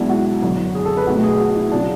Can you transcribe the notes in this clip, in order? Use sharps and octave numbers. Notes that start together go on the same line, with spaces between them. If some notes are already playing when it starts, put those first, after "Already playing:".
Already playing: B1 B2 G#3 B3 D4 E4
F#4
F#1 F#2 D3
G#4
A4
B4
B1 B2 A3 F#4
G#4
F#4
E4
C#3 F#3 D4